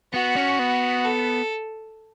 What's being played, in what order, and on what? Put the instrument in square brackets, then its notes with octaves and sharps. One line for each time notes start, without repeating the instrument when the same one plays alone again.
[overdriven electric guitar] B3 [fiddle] F#4
[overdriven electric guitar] C#4
B3
[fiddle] A4